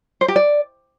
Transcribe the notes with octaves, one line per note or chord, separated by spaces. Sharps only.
C5
G4
D5